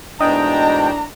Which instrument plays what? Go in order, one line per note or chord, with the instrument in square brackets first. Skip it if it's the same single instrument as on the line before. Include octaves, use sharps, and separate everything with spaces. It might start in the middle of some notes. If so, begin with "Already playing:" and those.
[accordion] G#2 B2 G5 [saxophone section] E3 A3 D4 [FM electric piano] D#5 [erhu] A#5